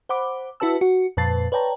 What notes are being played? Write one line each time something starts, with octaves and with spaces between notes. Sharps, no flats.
C5 F#5 B5 D6
E4 F#4 B4 A5 E6
F#4
F2 A#2 B4 A5 A6 C7
B4 C#5 D5 G5 A5 A#5